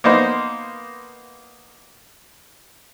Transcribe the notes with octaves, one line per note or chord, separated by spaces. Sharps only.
A#3 B3 D#4 C5